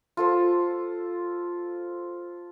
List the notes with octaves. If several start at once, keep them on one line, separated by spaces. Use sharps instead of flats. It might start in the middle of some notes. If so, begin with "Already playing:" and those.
F4 A4 C5